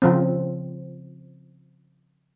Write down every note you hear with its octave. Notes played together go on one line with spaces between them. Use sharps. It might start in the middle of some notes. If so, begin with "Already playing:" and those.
C#3 F3 C4